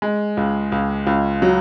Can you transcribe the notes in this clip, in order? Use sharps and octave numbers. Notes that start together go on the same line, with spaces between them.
G#3
C#2
C#2
C#2
F#3